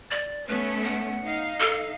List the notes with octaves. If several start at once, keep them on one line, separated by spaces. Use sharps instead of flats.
D5
A3 B3 C#4 B4
F#5
D#4 F5
A4